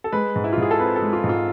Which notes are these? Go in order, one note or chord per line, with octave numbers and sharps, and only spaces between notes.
A4
G#3 B4
G#2
E4
F4
G#2
G#4
A4
C4 B4
A4
G#3
F4
G#2
F4